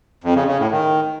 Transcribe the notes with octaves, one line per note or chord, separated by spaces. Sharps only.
F2
C#3
C#3
A2
D#3